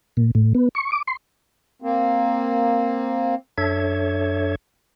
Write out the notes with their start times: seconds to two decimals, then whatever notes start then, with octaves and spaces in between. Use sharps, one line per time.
0.17 A#2
0.35 A2
0.55 B3
0.75 C#6
0.92 D6
1.07 C6
1.82 A#3 C4
3.58 F#2 D4 A4 C#5 E5 G#6